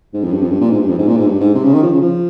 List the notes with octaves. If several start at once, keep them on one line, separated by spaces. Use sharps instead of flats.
G#2
F2
G2
F2
G2
A#2
G#2
G2
F2
G#2
A#2
G#2
G2
G#2
C3
C#3
D#3
F3
C#3
F3